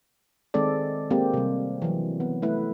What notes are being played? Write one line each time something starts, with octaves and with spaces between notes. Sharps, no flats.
D#3 G#3 C4 A4 D5
G#3 A#3 C4 G4
C3 G3
E3 F#3
B3
A3 E4 B4